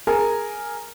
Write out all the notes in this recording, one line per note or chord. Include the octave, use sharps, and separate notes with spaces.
G#4 A#4 G#5